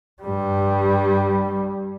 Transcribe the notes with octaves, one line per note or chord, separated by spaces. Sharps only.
G2 G3